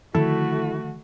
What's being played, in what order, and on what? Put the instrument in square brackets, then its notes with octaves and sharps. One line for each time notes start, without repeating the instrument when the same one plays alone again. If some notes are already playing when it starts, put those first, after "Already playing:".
[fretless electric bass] D3 D#3 F3 [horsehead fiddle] A3 F#4 [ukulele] E4 [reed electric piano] A4